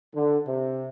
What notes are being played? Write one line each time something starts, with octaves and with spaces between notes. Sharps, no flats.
D3
C3